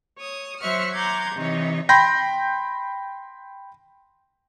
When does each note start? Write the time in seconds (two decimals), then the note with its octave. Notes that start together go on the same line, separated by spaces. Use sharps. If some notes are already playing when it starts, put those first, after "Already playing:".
0.18 C#5 D#6
0.60 F#3 C5 E5 F#5 C#6 F6
0.93 F#5 A#5 C6 D6 G6 G#6
1.35 C3 E3 D#4 C#5
1.89 G5 B5 C6 G6 A#6